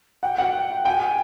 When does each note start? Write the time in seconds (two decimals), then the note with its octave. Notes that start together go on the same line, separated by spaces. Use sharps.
0.23 F#5 G5
0.38 F#5
0.85 G5 G#5